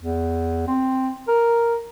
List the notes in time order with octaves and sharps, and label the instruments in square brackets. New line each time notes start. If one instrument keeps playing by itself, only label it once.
[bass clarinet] E2
C4
A#4